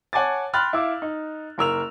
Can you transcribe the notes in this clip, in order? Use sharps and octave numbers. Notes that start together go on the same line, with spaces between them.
C#5 F#5 G#5 A5 D6 A6
G5 B5 C6 F6 F#6 A6
E4 F5 D6 E6
D#4
F#1 A#4 E6 F7